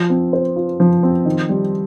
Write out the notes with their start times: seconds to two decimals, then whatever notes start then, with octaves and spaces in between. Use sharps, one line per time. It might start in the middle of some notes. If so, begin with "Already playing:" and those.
Already playing: F3
0.10 C4
0.33 C5
0.56 F4
0.80 F3
1.03 C4
1.25 D#3
1.49 G3